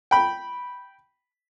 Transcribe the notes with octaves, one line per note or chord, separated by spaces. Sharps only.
G5 B5